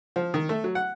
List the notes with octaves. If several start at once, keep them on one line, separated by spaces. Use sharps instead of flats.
F3
D#3
A3
F#3
F#5